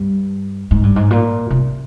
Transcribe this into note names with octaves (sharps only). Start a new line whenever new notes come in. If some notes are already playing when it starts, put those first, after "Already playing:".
Already playing: G2
G#2
G2
G#2
A#2
C3